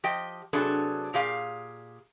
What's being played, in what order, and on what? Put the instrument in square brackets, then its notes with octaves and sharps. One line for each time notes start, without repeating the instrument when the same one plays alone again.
[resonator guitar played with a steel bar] F3 G4 D#5 G5
C3 F#3 B3 D4 G#4 A4
A#2 G4 G#4 F5